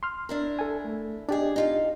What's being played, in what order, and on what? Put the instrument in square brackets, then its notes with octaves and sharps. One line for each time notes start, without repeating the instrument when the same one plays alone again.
[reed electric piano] C6 F6
[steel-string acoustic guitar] D4 E4 A#4
[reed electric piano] A4 G#5
A3
[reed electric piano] D4 G4 D#5 [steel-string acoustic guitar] G#4 D5
[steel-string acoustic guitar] D#4 F4 F5